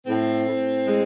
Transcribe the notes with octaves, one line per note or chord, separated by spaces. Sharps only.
A2 C4
A2
G#3